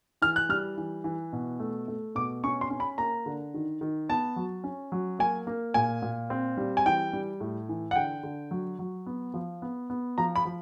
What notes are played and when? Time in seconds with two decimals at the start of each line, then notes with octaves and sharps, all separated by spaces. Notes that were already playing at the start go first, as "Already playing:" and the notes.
0.22 E3 F6
0.36 F#6
0.49 G3 F6
0.77 E3
1.04 E3
1.33 B2
1.60 A3
1.88 A3
2.15 B2 D6
2.44 C#4 C#6
2.61 C6
2.70 C#4
2.80 B5
2.98 A#3 A#5
3.26 D3
3.54 D#3
3.81 D#3
4.09 B3 A5
4.36 F#3
4.64 C#4
4.92 F#3
5.19 A#3 G#5
5.47 A#3
5.74 A#2 G#5
6.02 A#2
6.30 C4
6.57 G3
6.77 G#5
6.86 E3 G5
7.13 G3
7.40 A2
7.69 E3
7.91 F#5
7.96 D3 G5
8.23 D3
8.51 F#3
8.79 F#3
9.06 B3
9.34 F3
9.62 B3
9.90 B3
10.18 F3 A#5
10.36 B5
10.45 F3